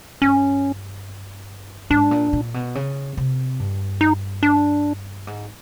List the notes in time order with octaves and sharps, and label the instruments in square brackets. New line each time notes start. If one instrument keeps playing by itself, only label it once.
[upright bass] G2 [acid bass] C#4
[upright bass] G#2 [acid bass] D4
[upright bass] A#2
A#2
B2
C#3
C3
G2
[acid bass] D#4
D4
[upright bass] G#2